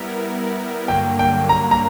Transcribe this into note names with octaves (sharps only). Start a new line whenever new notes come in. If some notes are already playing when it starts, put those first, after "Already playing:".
Already playing: G3 B3 E4 A#4
G2 D3 F#3 A#3 G5
G5
A#5
A#5